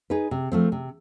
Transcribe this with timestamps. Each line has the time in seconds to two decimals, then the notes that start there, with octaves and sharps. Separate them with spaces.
0.10 D#4 G#4 B4
0.31 C3
0.52 F3 A3 C4
0.72 C3